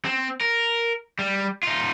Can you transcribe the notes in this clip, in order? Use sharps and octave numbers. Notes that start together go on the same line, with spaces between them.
C4
A#4
G3
D#4 F4